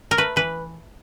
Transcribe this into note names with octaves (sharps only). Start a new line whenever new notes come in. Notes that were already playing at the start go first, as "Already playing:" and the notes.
A#4
A3 B4
E3 B4